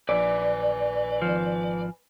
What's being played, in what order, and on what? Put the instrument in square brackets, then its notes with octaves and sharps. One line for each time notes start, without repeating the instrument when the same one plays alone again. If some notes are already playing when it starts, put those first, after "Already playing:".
[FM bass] A#1 [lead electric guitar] B4 G#5 [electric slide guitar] D5
[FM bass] G#1 [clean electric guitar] F3